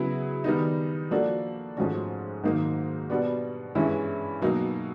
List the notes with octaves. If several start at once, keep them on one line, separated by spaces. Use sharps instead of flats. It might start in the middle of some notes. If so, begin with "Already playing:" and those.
Already playing: C#3 F#3 B3 E4 G#4
D#3 G3 B3 D#4
F3 A#3 D4 F#4 A4
G#2 F3 A3 C#4 F#4
G#2 D#3 F#3 A#3 D#4
B2 G3 B3 D4 F#4
G2 E3 G#3 C#4 E4
B2 F#3 A#3 D#4